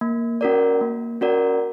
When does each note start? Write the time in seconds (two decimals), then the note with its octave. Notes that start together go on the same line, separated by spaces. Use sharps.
0.01 A#3
0.41 C#4 F#4 A#4 D5
0.81 A#3
1.21 C#4 F#4 A#4 D5